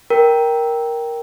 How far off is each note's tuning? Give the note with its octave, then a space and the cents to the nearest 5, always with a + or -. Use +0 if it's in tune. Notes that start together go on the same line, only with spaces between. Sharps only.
A#4 +5 G5 +0